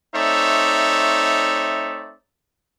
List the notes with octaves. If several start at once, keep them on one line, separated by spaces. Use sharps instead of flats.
A3 C4 D#4 C#5 D5 E5